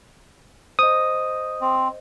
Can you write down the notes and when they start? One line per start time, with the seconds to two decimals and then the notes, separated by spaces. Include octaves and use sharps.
0.79 C5 D#5 D#6
1.61 C4